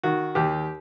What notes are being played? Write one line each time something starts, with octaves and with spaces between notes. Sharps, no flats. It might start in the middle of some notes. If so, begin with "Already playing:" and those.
D#3 F#4
D#2 G4